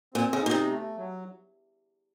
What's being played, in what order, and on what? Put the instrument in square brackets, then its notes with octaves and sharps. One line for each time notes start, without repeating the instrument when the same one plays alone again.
[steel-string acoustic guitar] A#2 [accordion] C4
[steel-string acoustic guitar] C#3
[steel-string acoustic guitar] A#2 [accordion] D#4
[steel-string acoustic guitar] C3
[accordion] A3
F#3